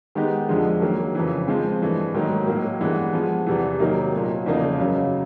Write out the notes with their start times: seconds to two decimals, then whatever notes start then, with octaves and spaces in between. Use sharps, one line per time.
0.15 D#3 G#3 B3 D#4 G4
0.49 F2 D3 F3 G#3
0.82 D#3 F#3 A#3
1.15 F2 C#3 E3
1.48 F3 G#3 C4
1.82 G2 E3 A3
2.14 G#2 D#3 F#3 A#3 D#4
2.47 A2 F#3 A#3
2.81 G2 E3 G#3 B3
3.13 F3 G#3 B3
3.46 E2 C3 E3
3.79 C3 D#3 F#3 A#3 D#4
4.13 A#2 F#3 A3
4.46 E2 C#3 F3 A#3 D#4
4.79 F#2 C#3 F#3